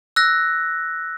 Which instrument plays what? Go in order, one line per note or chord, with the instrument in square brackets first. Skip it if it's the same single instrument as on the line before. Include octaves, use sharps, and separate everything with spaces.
[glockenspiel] E6 F#6 A#6